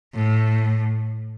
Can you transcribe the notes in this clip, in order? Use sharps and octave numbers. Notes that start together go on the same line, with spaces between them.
A2